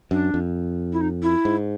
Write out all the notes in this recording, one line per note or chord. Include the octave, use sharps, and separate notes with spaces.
F#2 D4
F2
E4
D#4
E4
G#2